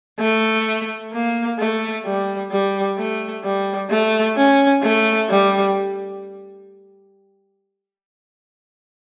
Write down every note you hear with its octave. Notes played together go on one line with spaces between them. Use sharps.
A3
A#3
A3
G3
G3
A3
G3
A3
C#4
A3
G3